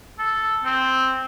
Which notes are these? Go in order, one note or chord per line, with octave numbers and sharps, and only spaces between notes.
A4
C4